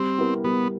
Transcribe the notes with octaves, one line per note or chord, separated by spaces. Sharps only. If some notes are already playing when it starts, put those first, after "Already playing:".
Already playing: G3 C4
B3 E4 G4 A#4
G3 B3